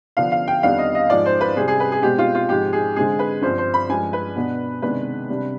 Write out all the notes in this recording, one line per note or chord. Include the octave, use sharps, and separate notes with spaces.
D3 F3 B3 D4 F5
F5
G5
F2 D#3 G3 B3 D4 F5
D#5
D#5
G#2 F3 G#3 D5
C5
B4
C3 G3 C4 G#4
G#4
B4
G#4
B2 G#3 C4 G4
F4
F4
G#2 F3 G#3 G4
G#4
D3 G#3 C4 G#4
B4
G2 F3 C4 C5
C5
B5
G2 F3 G#3 G#5
B4
B2 B3 D4
C3 D#3 G#3 B3 D4 B4
C3 G3 D4